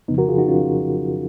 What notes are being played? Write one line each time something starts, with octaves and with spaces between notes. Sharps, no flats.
F2 C#3 F3 B3 D#4
F#4 A#4
F4 G#4
D#4 F#4
C#4 F4